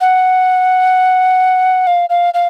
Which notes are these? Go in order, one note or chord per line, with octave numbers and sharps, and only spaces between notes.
F#5
F5
F5
F5